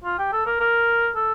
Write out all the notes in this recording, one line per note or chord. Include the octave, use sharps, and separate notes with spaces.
F4
G4
A4
A#4
A#4
A4